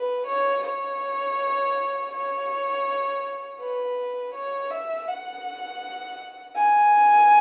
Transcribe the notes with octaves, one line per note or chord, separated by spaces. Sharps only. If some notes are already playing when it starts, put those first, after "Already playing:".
Already playing: B4
C#5
C#5
C#5
B4
C#5
E5
F#5
G#5